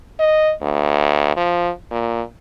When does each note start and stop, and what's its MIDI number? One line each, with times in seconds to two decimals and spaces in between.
0.20 0.53 75
0.62 1.32 38
1.37 1.70 53
1.91 2.22 46